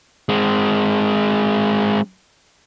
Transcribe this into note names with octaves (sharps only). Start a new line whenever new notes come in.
G#3 C4